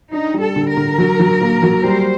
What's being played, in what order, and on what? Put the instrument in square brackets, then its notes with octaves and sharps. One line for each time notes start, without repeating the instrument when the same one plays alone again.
[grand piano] D4 [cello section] D#4
[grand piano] G3
[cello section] A4
[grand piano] D3
[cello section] A#4
[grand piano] D3
F#3
F#3
A#3
F#3
[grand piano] G3 [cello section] C5